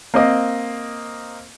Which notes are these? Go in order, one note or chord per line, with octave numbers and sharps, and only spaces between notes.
A#3 C4 D#5